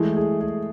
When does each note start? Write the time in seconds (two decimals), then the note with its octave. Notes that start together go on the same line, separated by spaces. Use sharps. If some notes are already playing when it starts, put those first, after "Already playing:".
Already playing: E3 G#3 A3
0.16 G#4
0.40 G#4